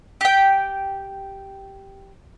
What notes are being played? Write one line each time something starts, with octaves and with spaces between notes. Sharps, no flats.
G4 G5